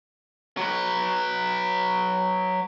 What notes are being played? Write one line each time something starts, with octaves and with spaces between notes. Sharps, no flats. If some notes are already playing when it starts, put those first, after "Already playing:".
F#3 B4